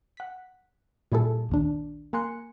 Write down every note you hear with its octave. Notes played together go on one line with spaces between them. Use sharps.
F#5 B6
A#2 G3 E4 G#4 A4
A#1 D#2 D4
A#3 A#4 G#5 C6 F#6 C#7